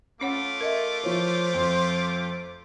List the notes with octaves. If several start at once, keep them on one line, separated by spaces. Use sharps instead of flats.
A3 C#4 F4 C#5 F#5 D6
A#4 D#5 E5
F3 C5 C#5
F2